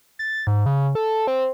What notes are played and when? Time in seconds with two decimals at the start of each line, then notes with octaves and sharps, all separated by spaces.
0.19 A6
0.47 G#2
0.66 C#3
0.95 A4
1.27 C4